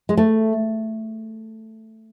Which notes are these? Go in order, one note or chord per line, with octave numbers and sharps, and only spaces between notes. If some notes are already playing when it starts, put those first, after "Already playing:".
G#3
A3